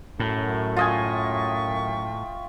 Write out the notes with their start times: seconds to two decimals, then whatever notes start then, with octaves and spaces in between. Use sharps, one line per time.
0.20 F#2 A2
0.76 F4 D#5 E5 G5 G#5 C#6